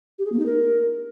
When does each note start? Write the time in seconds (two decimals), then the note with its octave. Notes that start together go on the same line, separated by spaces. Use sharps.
0.18 G4
0.25 G#4
0.32 A#3
0.38 D#4
0.45 A#4